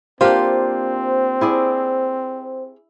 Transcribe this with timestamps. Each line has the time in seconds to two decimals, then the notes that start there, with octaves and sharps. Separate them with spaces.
0.21 A#3 C4 D4 F4 G4 C5
1.41 E4 G#4 D5